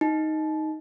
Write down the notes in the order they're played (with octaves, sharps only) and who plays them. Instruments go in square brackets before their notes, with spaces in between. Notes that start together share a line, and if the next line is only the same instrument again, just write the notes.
[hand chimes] D#4